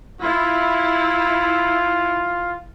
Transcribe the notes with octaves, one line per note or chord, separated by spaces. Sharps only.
E4 F4